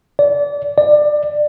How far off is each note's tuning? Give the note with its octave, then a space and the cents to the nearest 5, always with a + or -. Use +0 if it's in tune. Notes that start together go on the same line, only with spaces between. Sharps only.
D5 -25
D5 +20